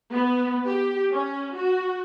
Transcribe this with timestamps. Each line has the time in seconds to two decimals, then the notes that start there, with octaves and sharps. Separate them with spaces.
0.12 B3
0.66 G4
1.12 C#4
1.55 F#4